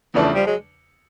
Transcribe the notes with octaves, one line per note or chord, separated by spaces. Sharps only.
E2 C#3 E3 F3 A3 D4
F3 G3
F#3 G#3